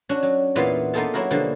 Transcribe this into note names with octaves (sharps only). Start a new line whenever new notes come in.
C#4 D4 F#4 F#5
F#3
E2 A#2 E3 B3 F4 F5
A#3 B3 D#4 F4 G#4 A4
F#3 A#3 E4 F#4 A#4
B2 D3 F3 G3 A#3